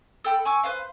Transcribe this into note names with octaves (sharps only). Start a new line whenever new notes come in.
A4 G5 B5
G#5 C#6 D6 E6
B4 C5 F5